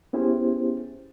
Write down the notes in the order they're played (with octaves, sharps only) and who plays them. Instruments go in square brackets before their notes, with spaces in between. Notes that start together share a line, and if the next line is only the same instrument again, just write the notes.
[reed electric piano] B3 C#4 E4 G4 G#4 C5